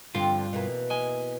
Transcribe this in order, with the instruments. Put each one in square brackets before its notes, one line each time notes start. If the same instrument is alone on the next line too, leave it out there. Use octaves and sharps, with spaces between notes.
[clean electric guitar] G2 F4 [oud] D3 F3 C4
[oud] B2 E3 A#3
[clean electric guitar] D#5 G#5